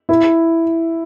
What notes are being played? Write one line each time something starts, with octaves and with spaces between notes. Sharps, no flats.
E4